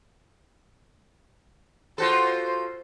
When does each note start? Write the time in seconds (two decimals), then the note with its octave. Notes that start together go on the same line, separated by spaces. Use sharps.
1.98 F4 F#4 A4 C5